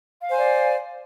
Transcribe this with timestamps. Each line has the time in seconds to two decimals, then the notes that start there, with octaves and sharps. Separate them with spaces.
0.22 F5
0.27 C5
0.32 G#5
0.37 D5